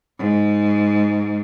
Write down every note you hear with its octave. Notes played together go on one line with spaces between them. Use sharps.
G#2